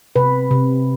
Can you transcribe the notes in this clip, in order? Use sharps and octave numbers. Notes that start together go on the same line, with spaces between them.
C3 B4
C3